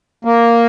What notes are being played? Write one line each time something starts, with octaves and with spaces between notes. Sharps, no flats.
A#3